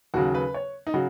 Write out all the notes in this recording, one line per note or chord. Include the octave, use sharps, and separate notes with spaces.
D#2 C#3 F#3 F#4
B4
C#5
D#4
C#3 F#3 F#4